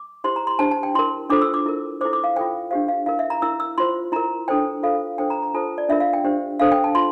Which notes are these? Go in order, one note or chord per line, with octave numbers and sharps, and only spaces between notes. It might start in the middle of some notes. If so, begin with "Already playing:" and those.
Already playing: D6
E4 G4 C5 C6
A#5
C6
D4 G4 C5 A5
A5
G5
E4 A#4 C6
D4 F4 A4 C5 D6
E6
D6
E4 A#4
E4 A4 C5 D6
D6
F5
F4 A4 C5 G5
D4 G4 C5 F5
F5
E4 A#4 F5
E5
A#5
E4 A#4 E6
E6
F4 C5 C6
E4 A#4 A#5
D4 A4 C5 G5
F4 A4 C5 F5
D4 A4 C5 G5
A#5
A#5
F4 A4 C5 A5
D5
D4 F4 A#4 E5
F5
G5
D4 G4 C5
D4 A4 C5 F5
G5
A5
F4 C6